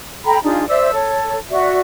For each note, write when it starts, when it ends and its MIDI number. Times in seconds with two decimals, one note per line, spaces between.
0.24 0.39 69
0.24 0.39 79
0.24 0.39 82
0.24 0.39 83
0.43 0.67 62
0.43 0.67 63
0.43 0.67 65
0.43 0.67 68
0.68 0.91 72
0.68 0.91 74
0.68 0.91 76
0.68 0.91 88
0.93 1.37 69
0.93 1.37 73
1.50 1.80 66
1.50 1.80 74
1.50 1.80 76